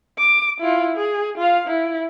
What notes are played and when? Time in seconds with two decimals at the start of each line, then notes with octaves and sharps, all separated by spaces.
0.18 D6
0.60 E4 F4
0.96 G#4
1.38 F4 F5
1.67 E4